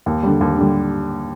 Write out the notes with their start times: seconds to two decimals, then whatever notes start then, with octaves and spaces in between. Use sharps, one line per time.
0.06 D#2
0.23 D3 G3
0.41 D#2
0.57 D3 G3